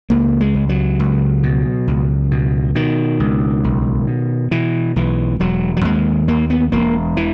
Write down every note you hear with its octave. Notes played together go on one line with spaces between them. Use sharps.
C#2 A#3
G#3
C#2
F#3
C#2
B2
C#2
B2
B2 D#3
C#2
B1
B2
B2 E3
B1 E3
E1 F#3
F#3
D#2 G#3
D#2 A#3
B3
E1 A#3
E3